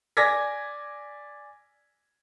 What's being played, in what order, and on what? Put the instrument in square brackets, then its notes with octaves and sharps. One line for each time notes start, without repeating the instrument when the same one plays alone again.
[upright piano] D5 G#5 D6 G#6 A#6 B6